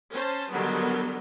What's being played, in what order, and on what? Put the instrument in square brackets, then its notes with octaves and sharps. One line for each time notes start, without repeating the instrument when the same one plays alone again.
[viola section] C#4 C5 A5
D3 D#3 F#3 G3 B3